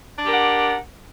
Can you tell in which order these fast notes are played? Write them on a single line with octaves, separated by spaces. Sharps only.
D4 G4 A#4 F#5